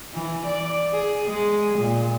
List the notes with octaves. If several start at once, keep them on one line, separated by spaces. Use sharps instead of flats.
E3
D5
G#4
G#3
A#2